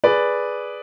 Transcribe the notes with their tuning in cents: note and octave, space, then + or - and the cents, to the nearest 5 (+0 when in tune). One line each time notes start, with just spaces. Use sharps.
G#4 +5 B4 +0 D5 +0